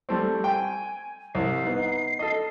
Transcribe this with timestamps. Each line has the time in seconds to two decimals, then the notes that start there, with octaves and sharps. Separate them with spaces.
0.09 G3 A3 C4
0.44 G5 G#5
1.35 C2 C7
1.66 B3 D#4
2.19 A4 D#5